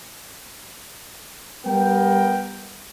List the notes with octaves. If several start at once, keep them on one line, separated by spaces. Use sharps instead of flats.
G3 B3 A#4 G5